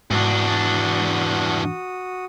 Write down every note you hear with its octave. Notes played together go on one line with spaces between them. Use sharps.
E2 G#2 D4 F#4 D#6